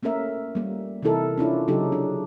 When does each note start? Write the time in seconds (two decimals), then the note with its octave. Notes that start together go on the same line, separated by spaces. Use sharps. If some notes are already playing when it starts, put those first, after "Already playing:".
0.03 A3 A#3 C#4 A#4 E5
0.55 G3 A#3
1.03 C3 E3 D#4 E4 A4 A#4
1.38 C#4 D4 E4 F4
1.68 C#3 F#3 D#4 G4 A4
1.92 D4